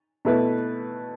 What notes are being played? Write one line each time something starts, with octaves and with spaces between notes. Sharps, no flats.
B2 A3 E4 B4